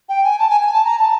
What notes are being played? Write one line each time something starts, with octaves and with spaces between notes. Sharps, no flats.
G5
G#5
A5
G#5
G#5
A5
A#5
A5